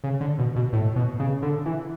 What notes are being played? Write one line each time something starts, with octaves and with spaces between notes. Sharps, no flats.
C#3
D3
B2
B2
A2
B2
C#3
D3
E3